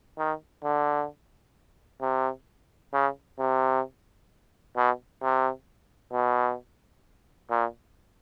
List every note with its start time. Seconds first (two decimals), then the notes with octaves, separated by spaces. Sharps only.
0.18 D#3
0.64 D3
2.01 C3
2.93 C#3
3.39 C3
4.76 B2
5.22 C3
6.13 B2
7.51 A#2